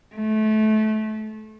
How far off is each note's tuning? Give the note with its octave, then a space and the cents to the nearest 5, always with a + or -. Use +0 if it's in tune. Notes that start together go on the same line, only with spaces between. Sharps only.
A3 -25